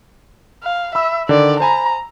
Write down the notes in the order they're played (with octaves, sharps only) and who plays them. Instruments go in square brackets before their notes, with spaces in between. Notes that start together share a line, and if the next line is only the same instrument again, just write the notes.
[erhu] F5
[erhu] E5 [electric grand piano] B5 E6
[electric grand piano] D3 D#3 [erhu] D5
[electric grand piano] C5 G#5 B5 [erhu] A#5